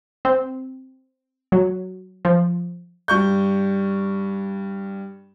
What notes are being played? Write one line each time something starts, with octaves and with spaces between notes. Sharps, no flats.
C4
F#3
F3
G2 C#6 G6